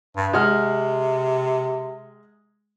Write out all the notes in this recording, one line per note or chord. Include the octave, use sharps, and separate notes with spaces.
G2
C3 G#3 F#5 F6